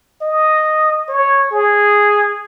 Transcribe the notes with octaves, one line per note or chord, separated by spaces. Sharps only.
D#5
C#5
G#4